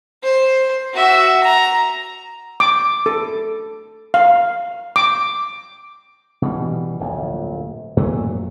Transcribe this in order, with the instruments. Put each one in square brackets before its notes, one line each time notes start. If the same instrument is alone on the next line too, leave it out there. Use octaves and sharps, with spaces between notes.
[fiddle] C5
F#4 E5
A#5
[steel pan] D6
A4
F5
D6
[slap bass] B2 E3 G3
D1 A#1 F2
F#2 A#2 F#3 A3